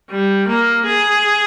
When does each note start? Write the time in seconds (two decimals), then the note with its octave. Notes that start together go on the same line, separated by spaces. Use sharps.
0.11 G3
0.48 A#3
0.85 G#4